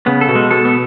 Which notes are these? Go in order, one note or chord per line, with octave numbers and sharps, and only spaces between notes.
C#3 B3
A4
B2
G#3
B2 A4
B3